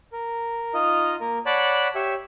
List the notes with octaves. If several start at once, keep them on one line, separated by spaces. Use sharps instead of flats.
A#4
D#4 F4 D#5
A#3 A#4
C#5 D5 F#5 A5 B5
G4 C#5 E5